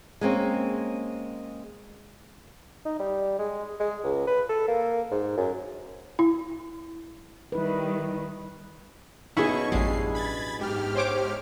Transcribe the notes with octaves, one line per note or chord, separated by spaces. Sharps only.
G#3 A#3 C4 C#4
D#4
G3
G#3
G#3
C#2
B4
A4
A#3
G#2
F#2
E4
D#3 G3 E4 B4
B2 C#4 E4 G#4 F#5 C#6
A1 F#2 G3 G#3 D4 C7
B5 G#6 A6
G#2 G4 F6
C5 C#5 D6